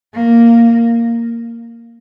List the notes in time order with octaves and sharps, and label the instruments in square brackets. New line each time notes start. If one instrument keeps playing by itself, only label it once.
[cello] A#3